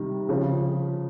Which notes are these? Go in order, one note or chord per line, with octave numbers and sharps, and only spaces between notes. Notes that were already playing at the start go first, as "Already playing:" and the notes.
Already playing: C3 D#3 G3
C#3 F3